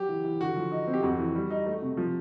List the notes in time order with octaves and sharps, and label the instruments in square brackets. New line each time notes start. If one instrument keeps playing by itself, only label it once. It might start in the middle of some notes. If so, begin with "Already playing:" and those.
Already playing: [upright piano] F#3 [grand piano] G4
[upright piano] E3
E3
[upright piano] D3 [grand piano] F#4
[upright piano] F3
D#4
C4
[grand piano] G4
[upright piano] F2 [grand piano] F#4
[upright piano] E3
G3
D#4
A3
C3
F3